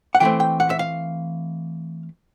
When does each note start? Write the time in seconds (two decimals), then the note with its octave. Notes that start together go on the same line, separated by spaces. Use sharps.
0.15 F#5
0.20 E3 A3 C4 G5
0.40 G5
0.60 F#5
0.70 E5
0.79 F5